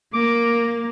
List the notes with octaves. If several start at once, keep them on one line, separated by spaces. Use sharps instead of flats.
A#3 D6